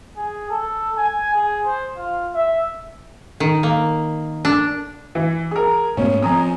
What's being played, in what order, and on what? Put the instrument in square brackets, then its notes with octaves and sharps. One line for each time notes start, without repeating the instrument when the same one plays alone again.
[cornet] G#4
A4
G#5
G#4
C5
F4
E5
[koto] D#3
A#3
D4
[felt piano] E3
G#4 A#4
[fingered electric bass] G#2 A3 B3 [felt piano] C#4
[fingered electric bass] F3 C4 [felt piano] G#5 A#5 D#6